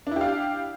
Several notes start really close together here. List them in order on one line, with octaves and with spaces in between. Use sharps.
D4 E4 G4 F5